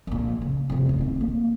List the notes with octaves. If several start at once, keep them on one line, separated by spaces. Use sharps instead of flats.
A#1 A#2
C#3
F2 C3
F#2 C#3
C4 D#4
A#3